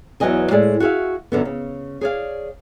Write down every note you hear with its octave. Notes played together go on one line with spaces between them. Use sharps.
E2 G#2 F#3 B4 D#5 G#5
A2 G#3 G#4 D5
F#4 G#4 C#5 E5 F5
F#2 D3 B3
C#3
G#4 C#5 D5 F5